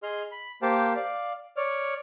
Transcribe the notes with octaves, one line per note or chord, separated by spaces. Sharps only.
G#4 D#5 C6 F6
B5
A#3 G4 C5 F5 G5 A5
D5 F5
C#5 D5 F6